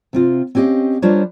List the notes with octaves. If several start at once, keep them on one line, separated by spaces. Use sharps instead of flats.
C3 C4 F4
C4 C#4 G4 B4 D#5 F5
G3 D4 F4 A#4 C5 C#5